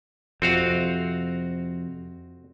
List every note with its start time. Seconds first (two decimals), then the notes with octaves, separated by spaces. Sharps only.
0.42 F2 C3 C4 F#4 F5